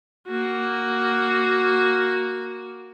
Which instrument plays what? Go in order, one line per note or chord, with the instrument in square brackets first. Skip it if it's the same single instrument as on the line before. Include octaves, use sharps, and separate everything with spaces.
[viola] A#3 F#4